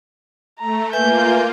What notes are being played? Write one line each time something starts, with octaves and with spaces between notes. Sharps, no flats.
A3 A#5
A#3 F4 B4 E5 G#5 G6